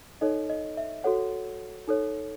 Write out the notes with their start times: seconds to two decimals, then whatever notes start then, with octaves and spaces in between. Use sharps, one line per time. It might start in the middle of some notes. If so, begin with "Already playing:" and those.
0.21 D#4 A4 C#5 D#5
0.50 D#5
0.77 E5
1.04 F#4 A4 C#5 F#5
1.88 D#4 A4 C#5